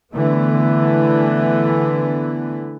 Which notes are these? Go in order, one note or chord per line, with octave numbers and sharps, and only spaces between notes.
D3 E3 A3 B3